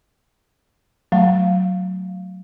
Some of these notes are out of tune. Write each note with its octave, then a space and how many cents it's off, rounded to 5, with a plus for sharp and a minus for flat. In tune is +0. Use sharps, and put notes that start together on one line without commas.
F#3 +0 A3 +0 F5 -10